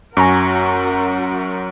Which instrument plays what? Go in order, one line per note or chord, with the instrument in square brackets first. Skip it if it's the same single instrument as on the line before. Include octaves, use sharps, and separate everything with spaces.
[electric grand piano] F#2 [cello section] F#4 A#4 [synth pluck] G#5 A#5 C#6